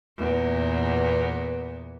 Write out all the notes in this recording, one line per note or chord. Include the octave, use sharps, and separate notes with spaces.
E2 A#2 B3